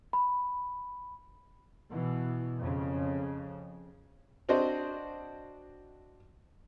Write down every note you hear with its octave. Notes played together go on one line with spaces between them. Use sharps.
B5
B2 E3
F2 C#3
C4 D4 F#4 C5 D#5